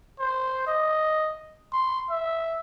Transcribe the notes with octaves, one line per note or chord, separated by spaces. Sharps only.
C5
D#5
C6
E5